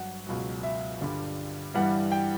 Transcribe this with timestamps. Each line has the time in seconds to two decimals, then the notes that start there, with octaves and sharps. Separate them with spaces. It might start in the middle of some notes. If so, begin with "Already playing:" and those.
Already playing: G2 F#3 F#5
0.27 C#2 B2 F#3
0.63 E5
1.01 G2 D3 G3
1.74 G2 E3 G3 F#5
2.12 G5